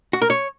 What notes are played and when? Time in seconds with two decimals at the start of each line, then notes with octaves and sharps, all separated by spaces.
0.13 F#4
0.22 A#4
0.30 C#5